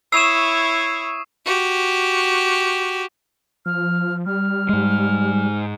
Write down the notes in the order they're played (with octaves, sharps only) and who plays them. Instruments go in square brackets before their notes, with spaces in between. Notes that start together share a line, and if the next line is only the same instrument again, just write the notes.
[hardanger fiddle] E4 C#5 [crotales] C#6 D#6 C7 [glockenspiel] E6 E7
[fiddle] F#4 G4
[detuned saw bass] F3 [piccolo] F6
[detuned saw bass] G3 [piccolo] F6
[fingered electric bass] G#2 G#3